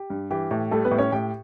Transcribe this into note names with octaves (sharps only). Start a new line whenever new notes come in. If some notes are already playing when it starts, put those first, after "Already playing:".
Already playing: G4
G2
E3 G4
A2
G3 A3 A4
B3 B4
A2
C#4 C#5
A2 G4 G5